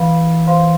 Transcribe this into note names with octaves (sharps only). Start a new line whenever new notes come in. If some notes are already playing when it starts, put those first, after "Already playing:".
Already playing: E3 B4 F5 B5
C5 F5 C6